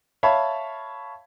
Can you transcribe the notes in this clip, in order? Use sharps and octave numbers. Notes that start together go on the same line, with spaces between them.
C#5 E5 F5 A5 B5